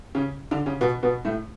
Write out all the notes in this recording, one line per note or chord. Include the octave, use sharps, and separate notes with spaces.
C#3 C#4
D3 D4
C#3 C#4
B2 B3
B2 B3
A2 A3